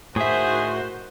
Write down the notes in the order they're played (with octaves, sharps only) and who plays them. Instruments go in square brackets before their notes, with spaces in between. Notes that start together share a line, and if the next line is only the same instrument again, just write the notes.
[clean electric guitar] A2 E5 [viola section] D#3 F#4 C5 [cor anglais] G#4